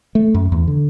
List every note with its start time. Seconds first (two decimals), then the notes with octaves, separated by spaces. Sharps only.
0.15 A3
0.34 F#2
0.52 E2
0.67 D3